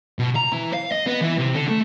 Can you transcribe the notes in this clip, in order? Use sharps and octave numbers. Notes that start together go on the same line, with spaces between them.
B2
A#5
E3
F5
D#5
B3
E3
C3
D3
A3